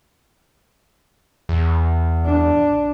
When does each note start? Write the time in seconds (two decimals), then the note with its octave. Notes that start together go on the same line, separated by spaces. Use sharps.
1.49 E2
2.25 D4